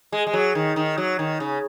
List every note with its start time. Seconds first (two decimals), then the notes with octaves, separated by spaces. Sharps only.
0.12 G#3
0.27 G#3
0.33 F#3
0.55 D#3
0.76 D#3
0.98 F#3
1.19 D#3
1.40 C#3